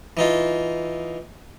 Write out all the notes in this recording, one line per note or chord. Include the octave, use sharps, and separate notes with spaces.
E3 D#4 F4